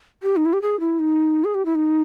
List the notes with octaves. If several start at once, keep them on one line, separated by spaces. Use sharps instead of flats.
G4
D#4
E4
G4
G#4
E4
D#4
G#4
G4
E4
D#4